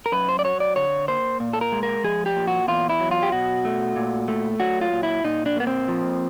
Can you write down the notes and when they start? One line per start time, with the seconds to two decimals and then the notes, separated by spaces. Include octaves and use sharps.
0.06 A#4
0.12 F#2 B4
0.29 C5
0.39 D5
0.44 F#3 C#5
0.60 D5
0.76 D3 C#5
1.08 A#3 C5
1.40 A#2
1.53 A4
1.61 A#4
1.72 G#3
1.83 A#4
2.04 F3 G#4
2.26 G4
2.36 A#2
2.47 F#4
2.68 E2 F4
2.89 E4
3.00 F#3
3.11 F4
3.23 G4
3.32 B2 F#4
3.65 A3
3.96 A#2
4.28 A3
4.60 F#3 F#4
4.81 F4
4.93 A#2
5.03 E4
5.24 A#2 D#4
5.46 D4
5.56 A#3 B3
5.67 C4
5.88 F3